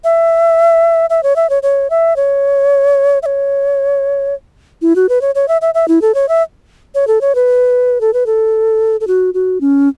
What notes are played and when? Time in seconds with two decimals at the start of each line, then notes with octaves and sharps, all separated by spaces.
0.04 E5
1.10 E5
1.23 C#5
1.36 E5
1.50 C#5
1.63 C#5
1.90 E5
2.16 C#5
3.23 E5
3.26 C#5
4.82 E4
4.96 F#4
5.09 B4
5.21 C#5
5.35 C#5
5.48 E5
5.62 E5
5.74 E5
5.88 E4
6.02 A4
6.14 C#5
6.29 E5
6.95 C#5
7.07 A4
7.21 C#5
7.35 B4
8.01 A4
8.13 B4
8.26 A4
9.01 A4
9.07 F#4
9.34 F#4
9.61 C#4